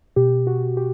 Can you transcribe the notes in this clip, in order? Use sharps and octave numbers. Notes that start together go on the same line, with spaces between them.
B2 G4
F#4
G4